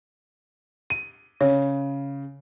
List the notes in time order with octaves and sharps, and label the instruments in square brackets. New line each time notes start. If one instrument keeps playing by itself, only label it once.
[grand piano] D#7
[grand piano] C#3 [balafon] C#5